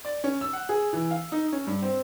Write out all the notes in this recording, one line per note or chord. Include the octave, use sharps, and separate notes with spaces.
D5
C#4
E6
F#5
G#4
E3
F5
D#4
C#4
G2
C4